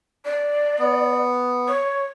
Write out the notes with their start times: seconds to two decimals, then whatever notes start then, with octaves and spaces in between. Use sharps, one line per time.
0.25 D5
0.79 B3
1.68 C#5